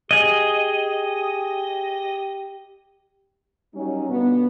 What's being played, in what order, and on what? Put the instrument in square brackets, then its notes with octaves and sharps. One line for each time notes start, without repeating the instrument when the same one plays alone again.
[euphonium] G4 [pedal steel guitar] G#4 D#5
[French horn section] F#3 G3 A#3 C#4 D#4
G2 B2 D3 B3